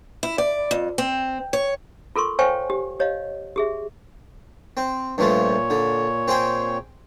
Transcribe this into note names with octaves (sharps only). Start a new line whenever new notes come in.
E4
D5
F2
C4
C#5
F4 A4 A#4 C6 C#6
C5 C#5 F5 G5 G#5 C#6
G4
G4 C#5 D#5 F5
G4 G#4 E5
C4
G2 A#2 F3 A3 C#5
D3
C4 G#4 G5